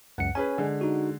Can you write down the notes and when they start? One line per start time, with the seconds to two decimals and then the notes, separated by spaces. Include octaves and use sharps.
0.18 C#2 F#2 F#5 C#7
0.35 C#4 G#4 B4 G#5
0.58 D3 G#3
0.81 D#4 F#4